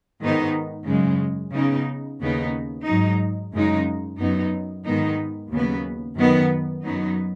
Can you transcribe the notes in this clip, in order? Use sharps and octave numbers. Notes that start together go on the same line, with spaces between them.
G#2 D#3 B3 D#4
F#2 C#3 G#3
C#3 B3 D#4
D#2 C#3 B3 D#4
G#2 F#3 D#4
F#2 C#3 G#3 D#4
F#2 F#3 B3 D#4
G#2 D#3 G#3 B3 D#4
D#2 C#3 F#3 B3
F#2 D#3 B3
F#2 F#3 B3 D#4